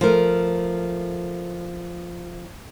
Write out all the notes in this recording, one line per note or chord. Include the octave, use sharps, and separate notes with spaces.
F3 A3 A#4